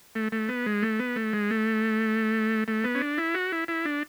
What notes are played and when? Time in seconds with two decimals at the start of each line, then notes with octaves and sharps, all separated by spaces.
0.15 A3
0.32 A3
0.49 B3
0.66 G#3
0.82 A3
0.99 B3
1.16 A3
1.33 G#3
1.51 A3
2.68 A3
2.84 B3
2.95 C#4
3.01 D4
3.18 E4
3.34 F#4
3.52 E4
3.68 E4
3.85 D4